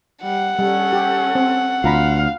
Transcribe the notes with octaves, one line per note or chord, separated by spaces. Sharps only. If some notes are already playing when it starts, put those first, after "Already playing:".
G3 F#5
G3 C#4 A4
G4
C4
D2 F4 F5 A#5 B5